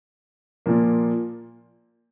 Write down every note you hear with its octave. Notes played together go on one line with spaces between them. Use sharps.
A#2 F3 A#3